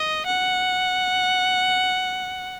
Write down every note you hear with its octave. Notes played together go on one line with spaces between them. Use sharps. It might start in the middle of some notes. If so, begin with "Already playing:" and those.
Already playing: D#5
F#5